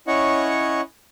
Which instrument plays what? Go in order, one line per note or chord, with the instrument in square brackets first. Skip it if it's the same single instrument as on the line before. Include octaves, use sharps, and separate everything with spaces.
[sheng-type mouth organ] C#4 E4 C#5 D#5 F#5 C#6